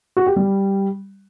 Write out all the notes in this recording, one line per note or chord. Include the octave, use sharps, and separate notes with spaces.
F#4
G4
G3